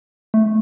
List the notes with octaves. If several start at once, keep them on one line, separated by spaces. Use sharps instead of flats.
A3